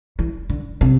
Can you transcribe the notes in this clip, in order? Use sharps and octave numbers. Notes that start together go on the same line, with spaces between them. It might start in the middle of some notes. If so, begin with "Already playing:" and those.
E3
D3
C3